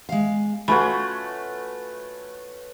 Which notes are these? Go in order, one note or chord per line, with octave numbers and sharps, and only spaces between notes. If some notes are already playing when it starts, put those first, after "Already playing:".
G#3 F5
A3 C#4 F4 F#4 B4 C#5 B5